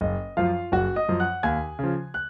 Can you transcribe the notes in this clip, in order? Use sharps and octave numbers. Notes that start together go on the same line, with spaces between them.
F#1 D#5
F#2 F3 F4 F5
F#1 F#4 F#5
D#5 D#6
F#2 F3
F#5 F#6
D#2 G#5 G#6
C#3 F3
F#6